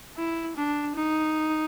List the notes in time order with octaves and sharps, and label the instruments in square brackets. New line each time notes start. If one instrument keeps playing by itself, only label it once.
[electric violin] E4
D4
D#4